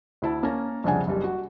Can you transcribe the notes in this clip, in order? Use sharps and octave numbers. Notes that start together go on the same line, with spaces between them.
D2 E4 A5
A#3 C#4 A#4 A5 A#5
C2 F2 C#3 D4 F#5 G#5
F#1 G3
F#4